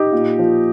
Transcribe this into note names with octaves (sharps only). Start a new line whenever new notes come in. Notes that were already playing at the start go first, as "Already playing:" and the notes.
Already playing: D#4 G4
A#2
F3